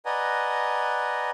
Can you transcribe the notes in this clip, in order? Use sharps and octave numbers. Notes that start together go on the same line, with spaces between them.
B4 D5 D#5 F#5 G#5 A#5